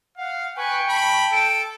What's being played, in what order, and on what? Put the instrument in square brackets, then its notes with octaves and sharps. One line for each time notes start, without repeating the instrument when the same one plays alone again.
[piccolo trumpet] F5 [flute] F#5
[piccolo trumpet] B4 [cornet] G5 [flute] G#5 [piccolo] C#6
[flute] A5 [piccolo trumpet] B5
[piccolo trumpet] A4 [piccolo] D7